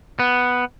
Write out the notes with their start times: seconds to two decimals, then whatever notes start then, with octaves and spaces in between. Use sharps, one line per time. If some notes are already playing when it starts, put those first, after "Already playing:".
0.19 B3